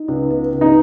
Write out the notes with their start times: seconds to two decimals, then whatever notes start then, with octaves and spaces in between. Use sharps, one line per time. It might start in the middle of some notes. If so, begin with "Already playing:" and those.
Already playing: D#4
0.08 C#2
0.30 B3
0.52 C#2
0.61 D#4